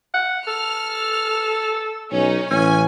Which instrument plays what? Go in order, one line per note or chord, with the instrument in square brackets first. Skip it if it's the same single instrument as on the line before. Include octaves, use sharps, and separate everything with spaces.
[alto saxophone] F#5
[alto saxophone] A4 [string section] F6
[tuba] B1 [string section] C#4 D#4
[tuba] A1 [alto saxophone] C#4 [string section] G#5